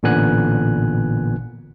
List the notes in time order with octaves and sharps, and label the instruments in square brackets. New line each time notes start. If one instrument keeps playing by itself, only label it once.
[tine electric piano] A1 A#2 D3 B3 G#5 F#6